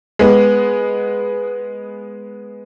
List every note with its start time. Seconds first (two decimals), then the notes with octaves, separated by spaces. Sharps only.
0.19 G#3 B3